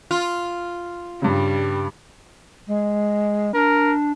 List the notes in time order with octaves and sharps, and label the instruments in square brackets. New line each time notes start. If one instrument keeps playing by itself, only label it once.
[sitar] F4
[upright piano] G2 C#3 [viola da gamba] G3
[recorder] G#3
[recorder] D4 [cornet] A#4